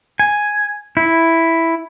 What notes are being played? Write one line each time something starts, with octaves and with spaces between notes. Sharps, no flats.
G#5
E4